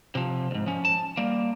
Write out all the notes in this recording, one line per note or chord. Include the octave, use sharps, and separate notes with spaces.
C3 F3
D2 G#2
F3 C#4
A5
G3 A#3